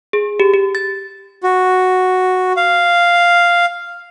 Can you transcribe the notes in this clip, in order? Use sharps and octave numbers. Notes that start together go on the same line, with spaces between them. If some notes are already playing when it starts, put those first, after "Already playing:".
G#4
G4
G4
A6
F#4
F5